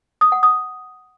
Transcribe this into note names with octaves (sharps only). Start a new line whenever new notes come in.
D#6
F#5
D#6